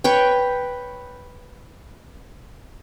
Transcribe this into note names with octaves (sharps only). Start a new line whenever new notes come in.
B4 C#5 G5